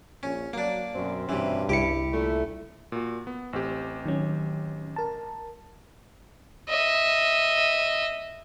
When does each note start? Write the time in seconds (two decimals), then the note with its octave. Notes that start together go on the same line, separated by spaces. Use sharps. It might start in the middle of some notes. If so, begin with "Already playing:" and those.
0.23 A#1 C#4
0.53 F#3 A#3 D4
0.95 F#2 B2 C4 C#4
1.29 G2 C3 E3
1.69 C2 E4 G4 C#7
2.11 A#2 D3 A3
2.92 A#2 F#4
3.27 B3
3.53 A1 C4 G4
4.05 D#3 F#3 C#4
4.96 A#4 A5
6.69 D#5 E5